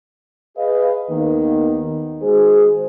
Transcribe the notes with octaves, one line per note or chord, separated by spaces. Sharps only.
G#4 B4 D#5 F5
D#2 D#3 A#3 B3
D#3 G#3 F#4 G#4 C5